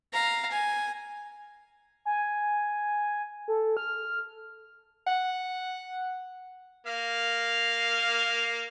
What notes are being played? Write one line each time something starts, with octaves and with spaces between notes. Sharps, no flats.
F5 A#5
G#5
G#5
A4
F6
F#5
A#3 F5